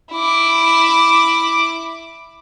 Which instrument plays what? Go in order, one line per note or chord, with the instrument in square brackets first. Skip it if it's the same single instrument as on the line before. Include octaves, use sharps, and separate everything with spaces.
[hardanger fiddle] E4 D6